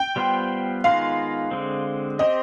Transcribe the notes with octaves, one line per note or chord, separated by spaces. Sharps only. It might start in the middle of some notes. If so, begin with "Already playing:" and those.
Already playing: G5
G3 B3 F4 C5
D#3 G#3 B3 F4 F5
D3 G#3 C4
C4 G4 C5 D#5